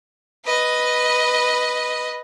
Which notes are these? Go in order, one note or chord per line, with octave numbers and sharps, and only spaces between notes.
B4 D#5